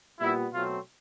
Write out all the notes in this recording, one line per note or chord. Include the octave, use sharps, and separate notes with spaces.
A#2 G3 B3 E4
B2 F#3 A3 C4 F4